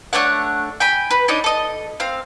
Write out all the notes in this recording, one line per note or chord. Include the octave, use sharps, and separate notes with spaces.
A3 D4 C#5 F#5
G5 G#5 B5
B4
D4 D#4 C#5 D#5
A4 D#5
C4 F5